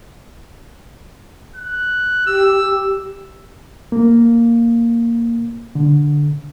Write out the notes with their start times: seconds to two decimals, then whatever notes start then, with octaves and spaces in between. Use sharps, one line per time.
1.56 F#6
2.27 G4 E6
3.92 A#3
5.75 D3